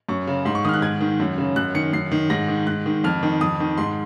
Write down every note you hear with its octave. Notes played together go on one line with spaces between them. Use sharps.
F#2 C#6
C#3
G#2 C6
C#6
D#3 D#6 F6
F#6
G#2 G#6
D#3
F#2
C#3
F#2 F#6
D#3 C#7
F#2 C7
D#3
G#2 A#6
D#3
G#2 F#6
D#3
F2 F6
D#3
F2 D#6
D#3
G#2 C6